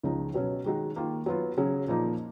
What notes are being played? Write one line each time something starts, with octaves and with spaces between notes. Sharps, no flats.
C#2 C#3 F3 G#3 D#4
B2 F#3 C#4
D#3 G#3 D#4 F#4
D#3 A#3 F4
F#3 B3 F4
C#3 F#3 C#4 G#4
A#2 F3 A#3 D#4